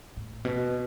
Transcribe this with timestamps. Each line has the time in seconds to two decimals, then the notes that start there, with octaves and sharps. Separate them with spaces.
0.17 A2
0.45 B2